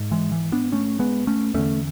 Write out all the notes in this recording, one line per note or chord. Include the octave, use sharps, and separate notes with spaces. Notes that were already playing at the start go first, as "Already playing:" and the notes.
Already playing: G#2
E3 G#3
E3
B3 D4
A3 C#4
G#3 B3
A3 C#4
E2 D3 A3 C#4